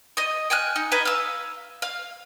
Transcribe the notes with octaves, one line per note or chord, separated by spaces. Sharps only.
D#5 D#6
G5 G#5 F6 F#6
D#4
B4 D#5 G#5 A#5
F5 E6
F5